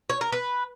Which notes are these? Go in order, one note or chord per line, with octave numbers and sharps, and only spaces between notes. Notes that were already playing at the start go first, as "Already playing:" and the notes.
C#5
A#4
B4